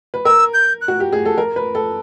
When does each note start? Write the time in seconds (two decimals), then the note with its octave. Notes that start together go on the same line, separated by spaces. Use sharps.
0.14 B4
0.25 A#4 E6
0.54 G6
0.81 F#6
0.88 F#4
1.00 G4
1.13 G#4
1.25 A4
1.38 A#4
1.56 B4
1.75 A4